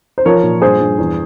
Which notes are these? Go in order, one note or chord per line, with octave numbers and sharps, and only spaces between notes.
C5
F3 A#4 C#5
A#2
G2 G#4 C5
G2
E2